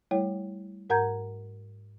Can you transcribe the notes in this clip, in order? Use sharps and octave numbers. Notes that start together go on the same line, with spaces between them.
G3 A3 E4 C#5 G5
G#2 A#4 F#5 A#5 G6 G#6